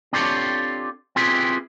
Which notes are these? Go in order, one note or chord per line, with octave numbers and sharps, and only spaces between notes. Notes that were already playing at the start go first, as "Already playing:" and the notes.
C4 D4 F4 G4 A4 C#5
C4 E4 F4 G4 G#4 B4